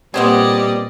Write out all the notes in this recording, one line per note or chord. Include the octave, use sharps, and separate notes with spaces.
A#2 G3 B3 C4 G#4 D5 D#5